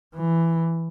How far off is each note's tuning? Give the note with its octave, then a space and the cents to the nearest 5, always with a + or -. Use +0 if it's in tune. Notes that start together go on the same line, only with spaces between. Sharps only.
E3 +10